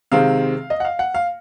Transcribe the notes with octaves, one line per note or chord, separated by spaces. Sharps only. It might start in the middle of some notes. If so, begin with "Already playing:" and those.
C3 D#3 G#3 C4 F5
D#5
F#5
F5
F#5
F5